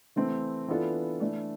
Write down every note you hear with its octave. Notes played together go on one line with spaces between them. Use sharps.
E3 A3 C4
E3 B3 D4 F4 A4
E3 A3 D4